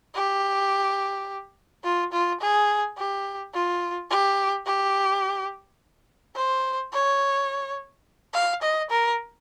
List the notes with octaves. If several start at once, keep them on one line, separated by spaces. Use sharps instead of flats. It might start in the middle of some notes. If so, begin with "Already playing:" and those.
G4
F4
F4
G#4
G4
F4
G4
G4
C5
C#5
F5
D#5
A#4